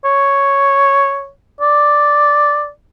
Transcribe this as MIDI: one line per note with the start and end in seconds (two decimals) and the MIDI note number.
0.05 1.28 73
1.61 2.69 74